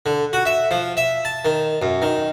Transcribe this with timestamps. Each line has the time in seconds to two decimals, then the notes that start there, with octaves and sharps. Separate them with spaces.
0.06 D3
0.33 F#4
0.46 E5
0.71 F3
0.97 E5
1.25 A5
1.45 D#3
1.82 F#2
2.02 D#3